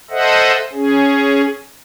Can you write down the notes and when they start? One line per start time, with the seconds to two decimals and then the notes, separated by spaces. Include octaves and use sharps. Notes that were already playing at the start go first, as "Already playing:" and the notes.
0.10 A4 C5 D#5 E5 F#5
0.73 C#4 G#4